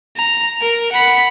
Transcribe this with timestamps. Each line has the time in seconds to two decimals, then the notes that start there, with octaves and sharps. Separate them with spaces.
0.17 A#5
0.62 A#4
0.92 F#5 B5